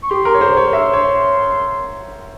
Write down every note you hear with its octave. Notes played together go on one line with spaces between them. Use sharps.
C#6
G4 C6
A#4
C#5
C5
C#5
E5
C#5